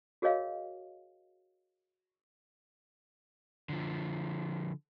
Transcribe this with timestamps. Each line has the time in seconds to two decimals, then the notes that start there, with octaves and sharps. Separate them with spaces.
0.22 F#4 G#4 A#4 C#5 D#5 F5
3.69 D3 F3